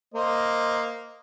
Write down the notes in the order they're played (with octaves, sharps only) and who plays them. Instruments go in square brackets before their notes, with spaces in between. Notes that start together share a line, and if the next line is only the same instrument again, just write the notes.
[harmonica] A#3 C5 D#5